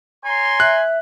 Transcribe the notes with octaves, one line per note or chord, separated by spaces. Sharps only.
C#5 G#5 A#5 C6
E5 F#6